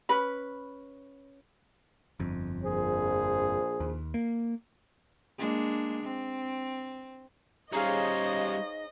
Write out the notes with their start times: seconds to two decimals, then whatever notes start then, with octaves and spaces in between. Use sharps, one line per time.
0.09 C#4 B4 B5
2.20 G1 F2
2.63 A#1 G#4 C5
3.80 D#2
4.14 A#3
5.38 G#3 A#3 D4
6.04 C4
7.73 G3 C#4 D#4 G#4 C5 C#5 D#5 F5